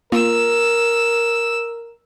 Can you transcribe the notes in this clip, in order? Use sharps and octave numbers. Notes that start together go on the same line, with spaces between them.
A#3 F4 A#4 E6